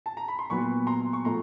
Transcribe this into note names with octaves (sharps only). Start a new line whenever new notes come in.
A5
A#5
B5
C6
A#2 F#3 B3 B5 C#6
A#5 C6
C#6
A2 F3 A3 A#5 C6